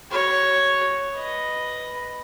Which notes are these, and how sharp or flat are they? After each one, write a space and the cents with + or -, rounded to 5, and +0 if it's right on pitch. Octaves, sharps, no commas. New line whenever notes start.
F#4 +25 C#5 +0
B4 +0 D#5 +0